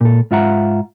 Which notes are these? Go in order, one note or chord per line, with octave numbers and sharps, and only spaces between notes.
A#2 A4
G#2 F4 E5 F#5 A#5